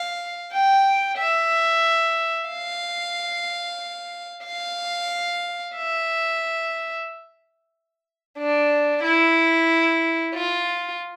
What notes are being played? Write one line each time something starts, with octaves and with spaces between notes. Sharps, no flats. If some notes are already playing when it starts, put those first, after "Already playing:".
Already playing: F5
G5
E5
F5
F5
E5
D4
E4
F4